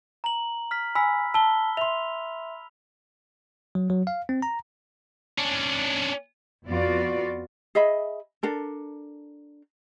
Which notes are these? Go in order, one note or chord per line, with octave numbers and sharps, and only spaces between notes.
A#5 F#7
F6 B6
G#5 B5 E6 B6
A5 E6 G7
E5 C6 F7
F#3
F#3
F5
C4
A#5
C#4 D4
F2 B3 F4 F#4 D5
G#4 D#5 E5 B5
D4 A4 A#4